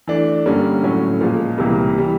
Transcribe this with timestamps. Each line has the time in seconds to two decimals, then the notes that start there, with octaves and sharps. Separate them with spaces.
0.08 E3 A3 D4
0.46 G2 D3 G3 A#3 C#4
0.83 A2 F#3 A3 C#4
1.21 A#2 F3 G#3
1.58 C#2 C3 E3 G3 A#3
1.98 E3 G3